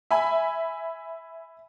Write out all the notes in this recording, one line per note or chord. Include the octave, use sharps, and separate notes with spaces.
E5 G#5 B5